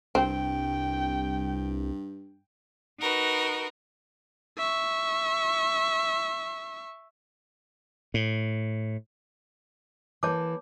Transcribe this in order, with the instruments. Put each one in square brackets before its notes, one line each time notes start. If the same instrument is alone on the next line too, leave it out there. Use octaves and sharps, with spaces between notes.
[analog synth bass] C2 [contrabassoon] G2 [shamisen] C4 [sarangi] G5
[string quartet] D#4 F#4 A#4 B4
[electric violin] E5 C#6
[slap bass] A2
[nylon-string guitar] E3 A#3 A4 [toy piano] C#5 A5 D6